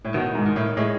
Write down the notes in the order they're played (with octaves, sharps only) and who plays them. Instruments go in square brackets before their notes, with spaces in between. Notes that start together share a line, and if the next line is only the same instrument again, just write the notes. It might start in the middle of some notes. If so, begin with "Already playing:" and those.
[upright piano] A2
[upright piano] B2 [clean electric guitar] D#3
[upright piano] G#2
[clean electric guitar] D#3
[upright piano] A2
[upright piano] A2 [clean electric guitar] G#3